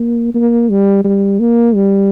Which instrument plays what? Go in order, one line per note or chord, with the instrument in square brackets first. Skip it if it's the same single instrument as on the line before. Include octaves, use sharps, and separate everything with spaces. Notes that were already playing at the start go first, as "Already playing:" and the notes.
Already playing: [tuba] A#3
A#3
G3
G3
A#3
G3